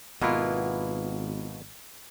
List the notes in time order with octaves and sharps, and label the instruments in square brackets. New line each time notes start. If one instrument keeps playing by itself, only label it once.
[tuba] G#1 [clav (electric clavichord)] B2 A#3 E4 [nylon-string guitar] B3 F4